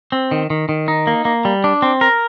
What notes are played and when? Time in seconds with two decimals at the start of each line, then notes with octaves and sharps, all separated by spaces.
0.12 C4
0.32 D#3
0.50 D#3
0.69 D#3
0.88 D#4
1.07 A#3
1.25 A#3
1.45 G3
1.64 D4
1.82 C4
2.01 A#4